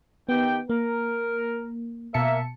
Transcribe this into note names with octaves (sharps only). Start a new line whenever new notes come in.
D#3 B3 G4 G5
A#3 A#4
B2 A#3 A#4 E5 A5 C#7